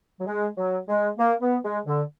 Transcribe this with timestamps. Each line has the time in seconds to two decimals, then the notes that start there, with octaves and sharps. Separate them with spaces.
0.20 F#3
0.26 G#3
0.57 F#3
0.87 G#3
1.18 A#3
1.41 B3
1.63 G#3
1.86 D3